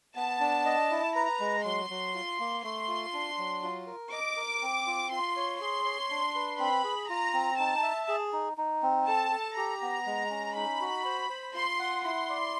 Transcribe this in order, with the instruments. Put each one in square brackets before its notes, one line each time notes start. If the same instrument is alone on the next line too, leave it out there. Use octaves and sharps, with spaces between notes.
[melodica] B3 [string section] A5
[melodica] D4
D#5
E4
[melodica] B4 [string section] A#5
[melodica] G#3
[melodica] F#3 [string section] C6
[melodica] F#3
F4
A#3
[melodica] A3 [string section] C6
[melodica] F4
D4
F#3
F4
A#4
[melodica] D#5 [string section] D6
[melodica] A#4
C4
F4
[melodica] F4 [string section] C6
[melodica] C#5
[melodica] G#4 [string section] C6
[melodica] C#5
D4
B4
[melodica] C4 [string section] B5
[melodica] G#4
[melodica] F4 [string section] A#5
[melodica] C4
[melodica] D#4 [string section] A5
[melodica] E5
G#4
D#4
D#4
C4
[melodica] A4 [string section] A5
[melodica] A4
[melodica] G4 [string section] A#5
[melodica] B3
G#3
C#4
[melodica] D#4 [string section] B5
[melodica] F#4
C5
C5
[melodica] F4 [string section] C6
[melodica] F#5
[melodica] E4 [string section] C6
[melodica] D5